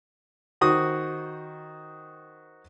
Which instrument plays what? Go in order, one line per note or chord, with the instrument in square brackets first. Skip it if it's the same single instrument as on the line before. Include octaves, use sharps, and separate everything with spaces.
[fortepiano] D#3 F#4 C5 D#6